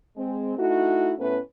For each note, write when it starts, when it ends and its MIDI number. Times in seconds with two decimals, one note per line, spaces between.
0.17 0.54 56
0.17 0.54 60
0.58 1.14 57
0.58 1.14 63
0.58 1.14 64
0.58 1.14 66
1.19 1.38 45
1.19 1.38 57
1.19 1.38 59
1.19 1.38 61
1.19 1.38 71